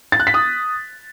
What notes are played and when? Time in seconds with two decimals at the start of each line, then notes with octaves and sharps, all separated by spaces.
0.12 A6
0.20 F#6
0.27 B6
0.34 D#6